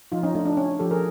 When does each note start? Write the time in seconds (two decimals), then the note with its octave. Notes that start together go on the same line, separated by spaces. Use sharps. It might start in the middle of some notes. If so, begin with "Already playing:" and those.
0.12 F3 D#4 F4
0.23 C#4 D#4
0.35 A3 D4
0.46 D4
0.57 C#4
0.79 F3 G4 A4
0.91 G#4 A#4